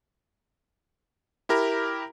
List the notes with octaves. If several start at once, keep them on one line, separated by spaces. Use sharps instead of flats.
E4 G4 A#4 A#5 B5